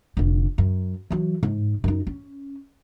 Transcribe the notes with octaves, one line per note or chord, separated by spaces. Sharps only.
F1 D3
F#2
E3 F#3
G#2
F#2 D#4
C#4